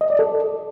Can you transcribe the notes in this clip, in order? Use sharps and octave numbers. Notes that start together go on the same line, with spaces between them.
D#5
D5
A4